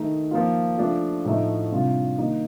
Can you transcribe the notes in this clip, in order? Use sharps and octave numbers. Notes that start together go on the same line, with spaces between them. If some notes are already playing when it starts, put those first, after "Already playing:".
Already playing: D#3 A3 D#4
F3 A#3 F4
F3 A3 D4 F4
A2 F3 A3 D#4
C3 G3 D4 F4
D#3 A#3 D#4